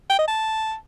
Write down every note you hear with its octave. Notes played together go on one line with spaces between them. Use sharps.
G5
D#5
A5